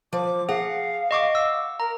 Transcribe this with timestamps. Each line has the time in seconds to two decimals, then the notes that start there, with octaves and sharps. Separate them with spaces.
0.13 F3 D6
0.49 G#4 F5 F#5
1.11 D#5 C#6 D6
1.35 E6
1.80 A#4 A#5